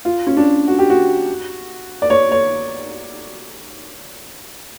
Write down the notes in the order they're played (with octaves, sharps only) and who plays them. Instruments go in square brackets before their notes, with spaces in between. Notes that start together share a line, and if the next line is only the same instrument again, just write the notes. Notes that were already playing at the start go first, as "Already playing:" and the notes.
[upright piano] F4
C#4
D4
F#4
G4
F#4
D5
C#5
C#5